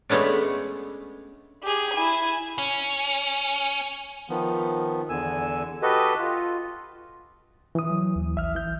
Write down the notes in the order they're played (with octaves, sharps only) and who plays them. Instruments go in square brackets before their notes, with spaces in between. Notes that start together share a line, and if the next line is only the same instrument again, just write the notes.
[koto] G#3 A3 B3 C#4 D4
[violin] G4 G#4
E4 G#5
[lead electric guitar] C#4
[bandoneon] D#3 F3 B3
E2 D3 G#5 E6
F#4 G4 A4 B4 D#5
F4
[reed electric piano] E3 D#6
[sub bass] F#3
D#2
[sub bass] A1 [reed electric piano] E5 F6
[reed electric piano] E3 G6